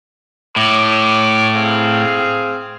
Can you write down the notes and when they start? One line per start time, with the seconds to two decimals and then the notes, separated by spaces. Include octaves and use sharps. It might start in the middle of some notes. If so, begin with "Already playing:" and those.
0.56 A2 C#5 D6
1.55 C4 G#4 F5